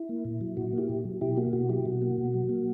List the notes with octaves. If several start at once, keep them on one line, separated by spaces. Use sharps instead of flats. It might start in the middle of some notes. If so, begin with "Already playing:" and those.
Already playing: E4
A#3
A#2
F#3
A#2 F#4
A#3
E4 G4
A#2
F#3
B2 E4 G4
A#3 F#4
B2 F#4
F#3 E4 G4
B2 F#4
A#3
B2
F#3
A#3